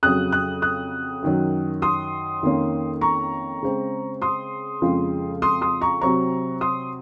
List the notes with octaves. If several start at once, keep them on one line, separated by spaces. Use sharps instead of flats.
F2 C#3 F#3 D#6 F#6
D#6 F#6
D#6 F#6
F#2 D#3 F#3
C6 D#6
F2 D#3 A#3 C#4
A#5 C#6
C#3 G#3 C4
C6 D#6
F2 C#3 F3 G#3
C6 D#6
C6 D#6
A#5 C#6
C3 F#3 C4 A#5 C#6
C6 D#6